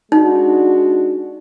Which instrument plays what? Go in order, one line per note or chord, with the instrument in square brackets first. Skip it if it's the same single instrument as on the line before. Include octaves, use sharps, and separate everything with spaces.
[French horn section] G#3 D4 F#4 [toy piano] D#4